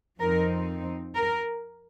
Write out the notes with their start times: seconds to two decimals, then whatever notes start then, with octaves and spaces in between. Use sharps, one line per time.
0.20 F2 F3 C4 D#4 A#4
1.15 A#4